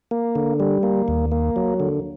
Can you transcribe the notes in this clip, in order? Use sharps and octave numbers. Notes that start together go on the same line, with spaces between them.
A#3
D3
G3
A#3
D#2
A#3
F#3
D3